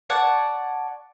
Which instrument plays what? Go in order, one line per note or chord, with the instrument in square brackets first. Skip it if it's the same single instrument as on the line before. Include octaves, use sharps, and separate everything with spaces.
[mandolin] C#5 D5 F#5 A5